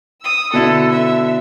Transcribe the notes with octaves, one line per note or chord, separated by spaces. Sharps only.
D#6 E6
B2 D3 E4 A4
E5